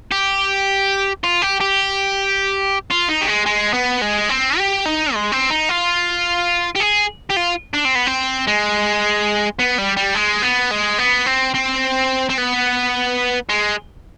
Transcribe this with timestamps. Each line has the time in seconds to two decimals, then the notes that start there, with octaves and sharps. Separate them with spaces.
0.12 G4
1.24 F4
1.42 G4
1.61 G4
2.91 F4
3.09 D#4
3.21 G3
3.27 G#3
3.46 G#3
3.74 B3
4.02 G#3
4.29 C4
4.58 G4
4.85 D#4
5.14 G#3
5.32 C4
5.50 D#4
5.69 F4
6.76 G4
6.80 G#4
7.30 G4
7.36 F4
7.74 D4
7.85 C4
7.95 B3
8.07 C4
8.47 G#3
9.59 B3
9.78 G3
9.97 G3
10.15 G#3
10.43 B3
10.71 G#3
10.98 B3
11.26 C4
11.55 C4
12.30 C4
12.38 B3
13.49 G#3